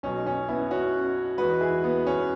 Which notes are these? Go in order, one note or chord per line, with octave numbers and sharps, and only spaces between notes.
B1 B2 F#3 C#4
C#4
B3 E4
C#4 F#4
E2 E3 G#3 F#4 B4
E4 G#4
B3
C#4